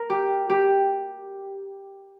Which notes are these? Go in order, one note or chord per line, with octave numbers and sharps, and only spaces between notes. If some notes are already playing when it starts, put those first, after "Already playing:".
Already playing: A#4
G4
G4